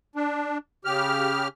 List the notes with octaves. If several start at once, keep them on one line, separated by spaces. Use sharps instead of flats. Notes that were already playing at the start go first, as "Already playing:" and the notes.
D4
C#3 G4 F6